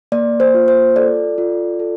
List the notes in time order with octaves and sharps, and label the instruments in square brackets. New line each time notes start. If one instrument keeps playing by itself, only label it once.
[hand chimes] A#3 D5
C5
F4
C5
A4 D5
F4
A4